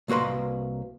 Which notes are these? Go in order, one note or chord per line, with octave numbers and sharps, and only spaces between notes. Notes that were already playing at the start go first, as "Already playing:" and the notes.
C2 A#3 F#4 B4 C6